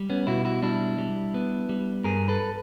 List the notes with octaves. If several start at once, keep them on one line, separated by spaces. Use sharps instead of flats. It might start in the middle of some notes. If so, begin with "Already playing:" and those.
Already playing: G3
B3 C#4
B2 E4 F#4
E4 F#4
G3 D4 E4
G3
B3
G3
G2 G#4 A#4
A4 B4